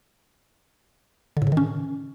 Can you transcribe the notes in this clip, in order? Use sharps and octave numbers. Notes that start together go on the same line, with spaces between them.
D3
A2
C#3
D#3
C#4